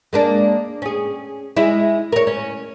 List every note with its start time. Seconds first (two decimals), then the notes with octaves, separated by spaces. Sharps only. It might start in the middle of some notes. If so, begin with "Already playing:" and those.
0.13 G#3 A#3 D4
0.82 C#4 G#4
1.57 G#3 E4
2.12 A#4 C#5
2.27 C#4